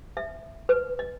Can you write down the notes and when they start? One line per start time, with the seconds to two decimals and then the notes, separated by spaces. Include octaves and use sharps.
0.17 E5
0.69 B4
0.99 D#5